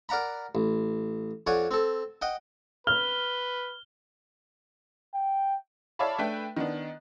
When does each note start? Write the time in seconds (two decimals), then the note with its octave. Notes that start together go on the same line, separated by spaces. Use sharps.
0.09 A#4 D5 F#5 A#5 B5
0.55 A1
1.47 F2 C#5 D5 F#5 G#5
1.71 C4 A4
2.22 D#5 F#5 G5
2.87 B4 F6 G7
5.14 G5
5.99 C#5 D5 E5 F5 A5 B5
6.19 A3 D4 B4 E5 G5
6.57 D#3 B3 D4